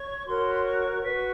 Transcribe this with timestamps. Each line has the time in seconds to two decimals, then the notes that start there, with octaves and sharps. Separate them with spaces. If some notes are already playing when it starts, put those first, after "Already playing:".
Already playing: C#5 C#6
0.26 F#4 A#4 C#5 C6
0.46 B5
0.55 C6
0.64 C#6
1.01 F#4 B4 C#6